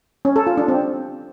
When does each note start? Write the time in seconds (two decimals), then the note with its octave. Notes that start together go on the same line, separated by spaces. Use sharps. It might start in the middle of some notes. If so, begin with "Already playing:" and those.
0.25 C#4
0.36 A4
0.47 F4
0.57 D4
0.68 C4